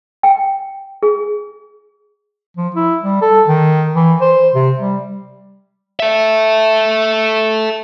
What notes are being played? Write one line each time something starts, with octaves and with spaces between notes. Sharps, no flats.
G5
G#4
F3
E4
G3
A4
D#3
E3
C5
C3
G3
A4 E5